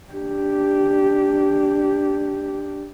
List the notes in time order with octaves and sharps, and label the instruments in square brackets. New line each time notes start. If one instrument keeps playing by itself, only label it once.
[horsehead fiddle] D4 G4